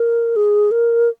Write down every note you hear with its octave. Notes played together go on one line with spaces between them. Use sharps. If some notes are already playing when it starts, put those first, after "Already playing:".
Already playing: A#4
G#4
A#4